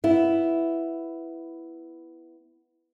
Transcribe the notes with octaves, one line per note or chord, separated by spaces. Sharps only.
B3 E4